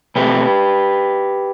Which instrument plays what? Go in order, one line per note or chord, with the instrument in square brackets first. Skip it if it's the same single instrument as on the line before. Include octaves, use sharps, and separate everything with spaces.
[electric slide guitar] B2 A3 C4 G4 B4